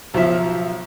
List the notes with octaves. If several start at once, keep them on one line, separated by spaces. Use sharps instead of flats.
B1 F3 E5